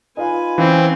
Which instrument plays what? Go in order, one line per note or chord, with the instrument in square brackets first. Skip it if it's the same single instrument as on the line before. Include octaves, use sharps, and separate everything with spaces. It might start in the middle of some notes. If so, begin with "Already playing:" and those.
[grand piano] D#4 F4 F5 [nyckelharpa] B4 G#5
[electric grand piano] E3 [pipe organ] C4 [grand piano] C#4 F5